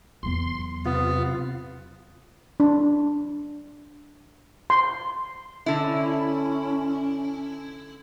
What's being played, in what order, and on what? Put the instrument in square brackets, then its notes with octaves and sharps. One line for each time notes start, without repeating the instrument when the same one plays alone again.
[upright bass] E2 F#3 [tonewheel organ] C6
[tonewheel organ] C3 F4 [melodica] B3
[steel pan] D4
C6
[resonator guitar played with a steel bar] D3 E4 [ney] C#4